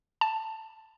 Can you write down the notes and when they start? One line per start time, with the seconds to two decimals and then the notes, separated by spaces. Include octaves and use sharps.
0.21 A5